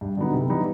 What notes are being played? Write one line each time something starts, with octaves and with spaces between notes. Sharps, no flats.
G2
D3 F#3 B3 D#4
C3
E3 G3 B3 D#4